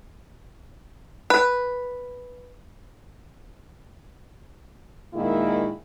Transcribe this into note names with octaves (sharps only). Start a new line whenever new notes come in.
B4
A#2 D#3 G#3 A#3 E4